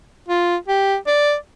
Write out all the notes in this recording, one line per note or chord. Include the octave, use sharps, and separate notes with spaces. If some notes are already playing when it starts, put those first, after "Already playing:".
F4
G4
D5